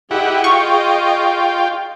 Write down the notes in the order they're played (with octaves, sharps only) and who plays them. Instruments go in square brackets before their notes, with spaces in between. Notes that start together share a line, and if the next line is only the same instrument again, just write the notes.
[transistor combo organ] E4 G4 F#5 [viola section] G#4 D#5
[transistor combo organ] F4 G5 [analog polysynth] C#6